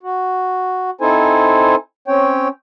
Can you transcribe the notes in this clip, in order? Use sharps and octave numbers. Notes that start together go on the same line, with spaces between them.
F#4
C4 D#4 E4 A4 C5 G#5
C4 C#4 C#5 G5